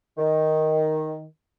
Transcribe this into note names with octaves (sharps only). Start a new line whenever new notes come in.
D#3